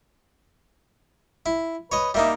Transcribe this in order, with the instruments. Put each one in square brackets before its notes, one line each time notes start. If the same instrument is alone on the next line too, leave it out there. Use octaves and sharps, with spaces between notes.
[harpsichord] E4
[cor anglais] B4 [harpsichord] C#5 D#5
[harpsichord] G3 A#3 D#4 [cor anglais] E5